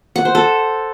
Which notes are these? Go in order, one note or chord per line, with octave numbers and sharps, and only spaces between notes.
F#5
C5
A4